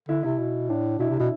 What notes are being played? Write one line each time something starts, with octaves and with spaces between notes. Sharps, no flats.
D3 E4
C3 E4
B2
A2 D4
B2 E4
C3
B2